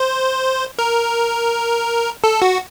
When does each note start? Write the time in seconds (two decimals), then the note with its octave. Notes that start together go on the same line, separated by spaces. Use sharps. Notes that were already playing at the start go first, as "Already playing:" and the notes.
Already playing: C5
0.79 A#4
2.24 A4
2.42 F#4